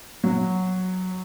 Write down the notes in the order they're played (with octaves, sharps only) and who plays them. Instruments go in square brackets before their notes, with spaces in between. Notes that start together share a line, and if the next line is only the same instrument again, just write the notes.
[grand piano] F#3